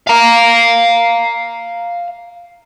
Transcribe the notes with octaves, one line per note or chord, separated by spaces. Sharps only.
F5 A#5